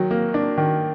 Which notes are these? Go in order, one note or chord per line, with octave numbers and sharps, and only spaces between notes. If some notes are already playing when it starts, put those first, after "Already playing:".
Already playing: D#3 F#3
A#3
D4
D#3